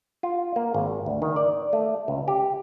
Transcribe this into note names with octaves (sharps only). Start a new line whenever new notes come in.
F4
A#3
G#1
D2
D#3
D5
A3
C#2
G4